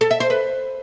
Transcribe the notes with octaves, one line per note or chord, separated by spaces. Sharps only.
A4
E5
C5
B4